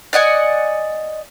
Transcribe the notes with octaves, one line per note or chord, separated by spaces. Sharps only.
D5 D#5 F#5 G#5